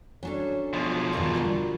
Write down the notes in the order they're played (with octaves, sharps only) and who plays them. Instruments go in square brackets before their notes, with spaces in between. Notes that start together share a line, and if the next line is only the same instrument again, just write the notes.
[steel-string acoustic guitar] F#3 D4 [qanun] C#4 A4
[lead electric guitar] B2 F3
[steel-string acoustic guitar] E2 G2 D#3 [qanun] F4 A#4 B4
[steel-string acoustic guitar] D3 F#3 G3